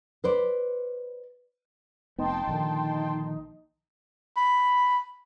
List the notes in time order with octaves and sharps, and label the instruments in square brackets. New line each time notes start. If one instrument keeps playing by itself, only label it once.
[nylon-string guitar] B4 C5 D5
[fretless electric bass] F1 B3 [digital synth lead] D#4 [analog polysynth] G5 A5 C6
[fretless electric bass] A#1 D3 D#3
[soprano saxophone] B5